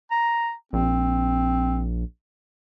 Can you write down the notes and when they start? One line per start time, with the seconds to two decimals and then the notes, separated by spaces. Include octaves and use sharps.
0.11 A#5
0.73 A#1 C4